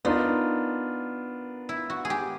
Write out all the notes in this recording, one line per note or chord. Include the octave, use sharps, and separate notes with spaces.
B3 D4 D#4 F4 A#4
E4
F#4
G#4
G4